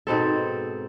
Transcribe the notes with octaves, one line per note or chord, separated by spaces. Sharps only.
G#2 B2 C4 A4